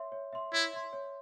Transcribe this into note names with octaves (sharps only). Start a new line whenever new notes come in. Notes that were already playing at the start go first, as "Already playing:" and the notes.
Already playing: C#5 E5 C6
C#5
E5 C6
E4 C#5
E5 C6
C#5